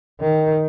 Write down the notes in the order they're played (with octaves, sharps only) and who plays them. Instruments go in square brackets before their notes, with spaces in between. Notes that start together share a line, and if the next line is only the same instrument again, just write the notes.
[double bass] D#3